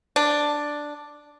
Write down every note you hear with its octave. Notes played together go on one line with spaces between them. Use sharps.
D4